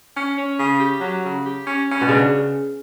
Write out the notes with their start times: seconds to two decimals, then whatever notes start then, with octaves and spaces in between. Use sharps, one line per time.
0.15 C#4
0.36 C#4
0.57 C#3
0.79 G4
1.01 F#3
1.23 C#3
1.44 G4
1.66 C#4
1.88 C#4
2.01 B2
2.09 C#3 D4